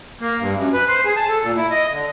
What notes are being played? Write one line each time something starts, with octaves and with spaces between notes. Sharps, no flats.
A#3
G2
F#2
B4
C5
G#4
A5
A4
A#2
E4
D#5
D3